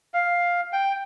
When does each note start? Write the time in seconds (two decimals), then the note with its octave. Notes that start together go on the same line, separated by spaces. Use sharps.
0.14 F5
0.73 G5